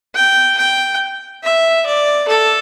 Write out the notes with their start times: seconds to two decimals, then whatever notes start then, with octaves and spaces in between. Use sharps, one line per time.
0.15 G5
0.57 G5
1.43 E5
1.86 D5
2.28 A4